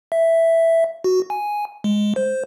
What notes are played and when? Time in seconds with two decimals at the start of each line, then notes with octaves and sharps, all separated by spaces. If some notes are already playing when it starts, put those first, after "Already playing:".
0.12 E5
1.04 F#4
1.30 G#5
1.84 G#3
2.16 C5